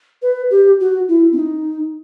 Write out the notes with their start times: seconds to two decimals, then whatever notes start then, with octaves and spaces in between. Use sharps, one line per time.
0.22 B4
0.50 G4
0.80 F#4
1.08 E4
1.32 C4
1.37 D#4